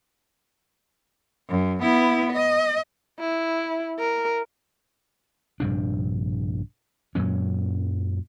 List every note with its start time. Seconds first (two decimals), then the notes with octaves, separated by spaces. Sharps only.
1.49 F#2
1.82 B3 E4
2.33 D#5
3.19 E4
3.99 A#4
5.60 A#1 G2 C3 D4
7.15 F#2 A#2 F#3 C#4